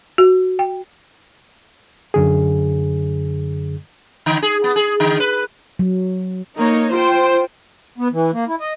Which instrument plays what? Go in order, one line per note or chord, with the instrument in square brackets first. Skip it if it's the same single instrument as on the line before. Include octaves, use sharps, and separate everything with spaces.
[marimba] F#4
G5
[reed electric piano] F#2 D3 G#4
[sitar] D3
G#4
B3
G#4
D3
B4
[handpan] F#3
[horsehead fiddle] A#3 [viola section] D#4 C#5
[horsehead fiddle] F4 [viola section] C5 G5
[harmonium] B3
E3
A#3
E4
D#5